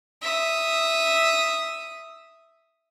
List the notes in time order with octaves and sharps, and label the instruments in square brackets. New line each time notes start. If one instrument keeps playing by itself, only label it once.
[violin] E5 D#6